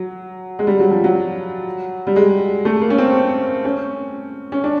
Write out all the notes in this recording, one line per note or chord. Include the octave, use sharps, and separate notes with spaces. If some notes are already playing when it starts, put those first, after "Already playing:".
Already playing: F#3
G#3
G3
F#3
F3
F#3
G3
G#3
A3
A#3
C#4
C4
C#4
C#4
D4